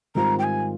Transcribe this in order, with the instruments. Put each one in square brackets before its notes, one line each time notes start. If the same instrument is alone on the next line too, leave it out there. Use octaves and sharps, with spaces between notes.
[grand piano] G#2 D#3 G3 C4 F4 [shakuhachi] A#5
[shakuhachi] G5
G#5